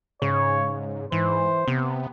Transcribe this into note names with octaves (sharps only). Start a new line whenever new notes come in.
G#2 C#3 C#5
G#2 E3 C5
C3 B3